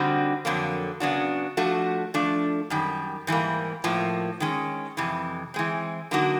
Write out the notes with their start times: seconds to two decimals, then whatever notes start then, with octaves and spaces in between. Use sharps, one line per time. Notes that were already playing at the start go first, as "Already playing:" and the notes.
Already playing: D3 G3 C4 D#4 F#4
0.45 F2 D3 F#3 A#3
1.00 C#3 F#3 B3 D4 F#4
1.57 F3 A3 D4 F#4
2.14 F3 A3 D4
2.70 F#2 D#3 G3
3.27 G#2 E3 G3 A#3
3.84 A2 F3 A#3
4.40 D#3 G#3 C#4
4.97 F2 C3 E3
5.54 E3 G#3 C4
6.11 D3 F#3 A#3 D#4 F#4